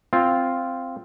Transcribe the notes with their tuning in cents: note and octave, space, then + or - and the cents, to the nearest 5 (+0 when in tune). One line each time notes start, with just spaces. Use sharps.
C4 +0 F4 +0